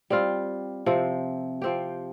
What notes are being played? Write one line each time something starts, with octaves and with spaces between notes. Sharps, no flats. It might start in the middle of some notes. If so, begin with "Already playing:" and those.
G3 C4 F4
C3 F3 C4
F3 C4 G4